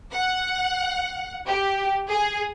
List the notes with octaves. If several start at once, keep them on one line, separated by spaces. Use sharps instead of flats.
F#5
G4
G#4